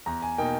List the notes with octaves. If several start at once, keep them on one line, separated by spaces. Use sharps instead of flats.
E2 A#5
G#5
B2 A#3 D#4 G5